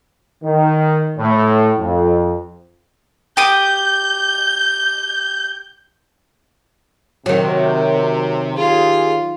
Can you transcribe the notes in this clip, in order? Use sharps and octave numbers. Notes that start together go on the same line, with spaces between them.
D#3
A2
F2
G4 D#6 G6
C3 D#3 F#3
F4 G4 G#4